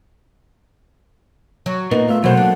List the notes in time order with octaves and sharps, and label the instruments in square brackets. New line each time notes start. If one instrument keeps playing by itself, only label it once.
[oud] F#3
[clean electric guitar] A#2 A#3 D#4 [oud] B3
[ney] A3 [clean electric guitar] F4 E5
[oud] B2 C5 [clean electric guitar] F#3 A3 A#3 [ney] F#5
[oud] D4